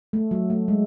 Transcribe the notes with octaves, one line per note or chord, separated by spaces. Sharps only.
A3
F#3
A3
G#3